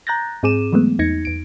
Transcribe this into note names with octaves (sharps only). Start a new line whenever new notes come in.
A#5 F#6 G6 A6 A#6
G#2 C4 G#4 D6 D#7 E7
E3 F#3 G#3 A3 B3
E2 D#4 G#6 A#6 C#7
E2 D7